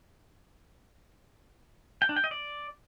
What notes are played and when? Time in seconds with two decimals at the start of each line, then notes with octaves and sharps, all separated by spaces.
2.02 G5
2.09 D4
2.16 G5
2.24 D#5
2.31 D5